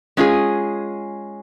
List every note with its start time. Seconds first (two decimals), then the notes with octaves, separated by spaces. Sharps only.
0.17 G#3 C#4 F4 G#4